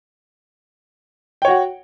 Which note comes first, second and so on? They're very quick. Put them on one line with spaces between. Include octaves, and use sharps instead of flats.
G5 C#5 F#4 F#5